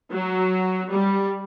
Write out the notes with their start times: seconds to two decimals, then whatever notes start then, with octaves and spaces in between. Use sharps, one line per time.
0.11 F#3
0.90 G3